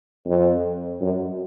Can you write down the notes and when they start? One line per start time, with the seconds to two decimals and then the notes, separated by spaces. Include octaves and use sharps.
0.26 F2
1.01 F#2